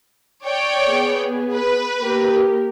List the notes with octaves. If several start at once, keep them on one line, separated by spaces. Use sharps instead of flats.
C#5 D5 G5
B3 G#4
B4
A#3 G4 A#4